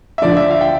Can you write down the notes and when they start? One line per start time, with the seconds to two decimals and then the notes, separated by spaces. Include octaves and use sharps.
0.18 E5
0.22 D2 D3 F3 D5
0.37 E5
0.50 F5
0.61 G5